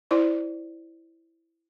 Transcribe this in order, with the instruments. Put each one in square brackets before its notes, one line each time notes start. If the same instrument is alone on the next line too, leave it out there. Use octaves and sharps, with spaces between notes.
[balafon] E4 C5 D5 C6